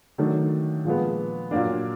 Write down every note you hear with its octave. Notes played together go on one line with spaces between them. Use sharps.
D#3 F#3 A3 D4
A#2 F3 G#3 B3
A#2 F#3 A#3 D4